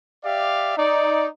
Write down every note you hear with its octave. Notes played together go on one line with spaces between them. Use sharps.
G4 D5 E5 F5
D#4 D5